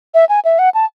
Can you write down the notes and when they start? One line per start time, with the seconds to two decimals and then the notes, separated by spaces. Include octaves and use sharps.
0.14 E5
0.29 G#5
0.45 E5
0.59 F#5
0.75 A5